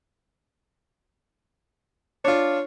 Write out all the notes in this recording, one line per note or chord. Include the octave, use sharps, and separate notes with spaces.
D4 F4 C#5